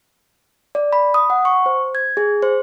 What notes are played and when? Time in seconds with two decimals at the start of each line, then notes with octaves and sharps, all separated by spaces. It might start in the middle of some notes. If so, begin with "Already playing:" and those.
0.75 D5
0.93 B5
1.14 D#6
1.30 F#5
1.45 C#6
1.66 C5
1.95 G#6
2.17 G#4
2.42 C5